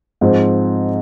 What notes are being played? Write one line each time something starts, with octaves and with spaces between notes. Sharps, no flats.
G#2 F3 C4 G#4